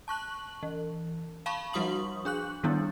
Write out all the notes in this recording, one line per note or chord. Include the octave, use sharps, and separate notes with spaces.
A5 C#6 F#6 F#7
E3
F5 A5 B5 C#6
F3 G3 F#4 C#6 D#6 F#7
D4 G#4 F#6 F#7
D#3 G3 B3 D4 E4